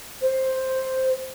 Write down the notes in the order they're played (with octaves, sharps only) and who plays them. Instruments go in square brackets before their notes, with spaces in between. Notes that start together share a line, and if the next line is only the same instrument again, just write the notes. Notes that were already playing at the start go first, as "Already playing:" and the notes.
[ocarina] C5